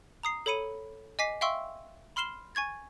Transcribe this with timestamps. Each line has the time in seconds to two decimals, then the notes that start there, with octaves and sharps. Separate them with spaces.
0.23 A#5 D#6 C7
0.46 A4 C#5 B5 C#7 D#7
1.19 D#5 G#5 D6 B6 C7
1.41 E5 F5 G5 C6 C#6 E6
2.16 B5 C6 F6 C7 E7 G7
2.55 G#5 C#6 G#6 A6